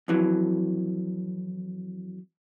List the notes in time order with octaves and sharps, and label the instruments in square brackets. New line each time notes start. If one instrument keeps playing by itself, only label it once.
[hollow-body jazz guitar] F2 E3 F#3